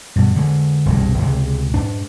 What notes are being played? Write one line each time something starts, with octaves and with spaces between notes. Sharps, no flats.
G2 B2
D3 G#3
E1 C2 G2
C#2 C3 F3 G#3
G#2 D4